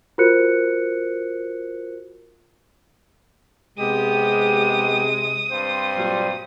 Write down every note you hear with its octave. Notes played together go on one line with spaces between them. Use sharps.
F4 F#4 A#4 C5 F#6 C#7
C3 G#3 B3 G4 D#6
G2 C4 C5
A#2 F#3 G3